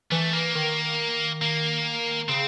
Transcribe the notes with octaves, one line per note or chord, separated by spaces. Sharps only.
E3 A3
A#3
D#3
A#3
C#3 C4